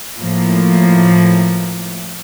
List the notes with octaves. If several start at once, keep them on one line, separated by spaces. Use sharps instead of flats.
A2 F3 A#3